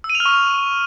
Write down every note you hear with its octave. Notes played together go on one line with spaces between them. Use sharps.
E6
D#7
F7
F6
C#6